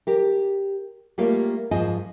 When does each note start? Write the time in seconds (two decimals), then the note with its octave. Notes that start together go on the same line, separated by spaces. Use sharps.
0.07 G4 A#4
1.18 G3 A3 A#3 F4 A#4 C#5
1.71 G#2 F3 F4 C5 D#5 G#5